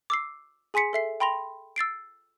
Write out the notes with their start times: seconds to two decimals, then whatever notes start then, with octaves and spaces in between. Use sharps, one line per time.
0.10 D6 E6 C7
0.74 G#4 G#5 C6 B6 C#7
0.93 A4 E5 C7
1.20 G5 B5 C6 A#6 F7
1.76 E6 A6 C7 D7